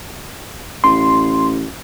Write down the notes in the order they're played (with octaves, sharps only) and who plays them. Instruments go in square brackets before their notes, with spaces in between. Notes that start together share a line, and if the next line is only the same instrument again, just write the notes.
[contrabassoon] A1 [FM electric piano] C6